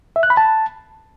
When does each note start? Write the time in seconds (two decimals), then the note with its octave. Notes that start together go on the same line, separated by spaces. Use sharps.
0.16 E5
0.23 F#6
0.30 B5
0.37 A5